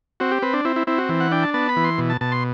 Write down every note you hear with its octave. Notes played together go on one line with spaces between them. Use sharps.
C4 F#4
G4
C4 B4
D4
C4 E4
E4
C4 E4
F#4
E3
F#5
D4 G5
A5
B3 A5
B5
E3
C6
B2
A5
B2 A5
C6